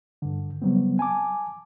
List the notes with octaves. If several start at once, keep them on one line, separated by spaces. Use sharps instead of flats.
G2 D3
C#3 F#3 G3 B3 C4
G#5 A5 D6